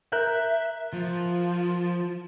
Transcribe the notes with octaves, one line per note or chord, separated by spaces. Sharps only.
A#4 E5 F#6 G6
F3 F4